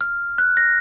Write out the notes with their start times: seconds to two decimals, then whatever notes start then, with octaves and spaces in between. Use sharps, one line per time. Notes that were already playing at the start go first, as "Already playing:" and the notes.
0.01 F6
0.38 F#6
0.57 A#6